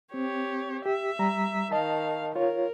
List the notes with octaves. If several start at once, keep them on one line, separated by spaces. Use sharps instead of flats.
C4 G4 C#5
G4 E5
G3 A#5
D#3 D#5 F5 A5
F4 A#4 C#5